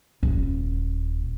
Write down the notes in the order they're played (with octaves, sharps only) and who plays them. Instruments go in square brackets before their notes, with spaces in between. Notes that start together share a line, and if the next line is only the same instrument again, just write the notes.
[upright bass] D#1